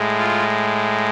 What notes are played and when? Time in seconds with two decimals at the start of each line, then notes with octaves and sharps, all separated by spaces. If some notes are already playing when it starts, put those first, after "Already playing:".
Already playing: A2 G#3
0.18 F4